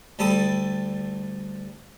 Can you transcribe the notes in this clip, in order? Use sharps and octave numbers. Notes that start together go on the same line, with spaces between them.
D2 G3 A4 A5 B5 D#6